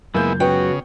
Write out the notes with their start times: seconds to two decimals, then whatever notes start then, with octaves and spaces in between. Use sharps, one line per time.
0.14 C#2 F#2 G#3 A#3 B3 E4 G6
0.40 C#3 B3 F#4 G5